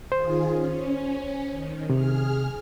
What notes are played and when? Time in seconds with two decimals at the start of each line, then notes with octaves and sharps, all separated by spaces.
0.12 D#3 F4 G#4 C5
0.50 C#4
1.49 D#3
1.90 C3 G#4 F6